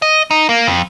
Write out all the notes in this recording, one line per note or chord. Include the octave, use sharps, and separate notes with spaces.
D#5
D#4
A#3
F2